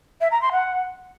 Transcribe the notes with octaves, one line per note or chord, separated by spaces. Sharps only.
E5
A#5
C6
F#5